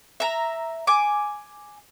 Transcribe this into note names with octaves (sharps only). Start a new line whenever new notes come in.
E5 A#5
G#5 D6